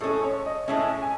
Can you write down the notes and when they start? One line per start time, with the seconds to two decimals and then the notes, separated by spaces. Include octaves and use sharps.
0.01 A2 G#3 C#4 A4
0.24 C#5
0.46 D#5
0.68 A2 G#3 C#4 E5
1.02 G#5